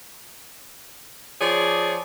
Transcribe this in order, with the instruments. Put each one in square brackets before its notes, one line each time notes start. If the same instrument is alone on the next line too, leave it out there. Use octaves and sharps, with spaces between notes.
[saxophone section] F3 G#4 C#5 D5